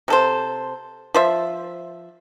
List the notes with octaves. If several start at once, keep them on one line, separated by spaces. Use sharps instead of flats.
C3 A4 C5
F3 C5 E5